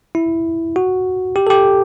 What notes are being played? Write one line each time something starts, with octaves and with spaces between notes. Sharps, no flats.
E4
F#4
G4
A4
G4